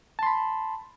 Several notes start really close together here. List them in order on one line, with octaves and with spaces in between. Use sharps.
A5 C6 B5